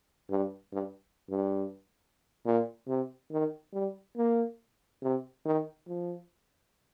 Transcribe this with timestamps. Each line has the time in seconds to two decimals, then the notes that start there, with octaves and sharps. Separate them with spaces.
0.30 G2
0.73 G2
1.30 G2
2.45 A#2
2.88 C3
3.31 D#3
3.73 G3
4.17 A#3
5.02 C3
5.45 D#3
5.88 F3